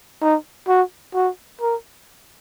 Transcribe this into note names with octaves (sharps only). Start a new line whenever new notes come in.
D#4
F#4
F#4
A#4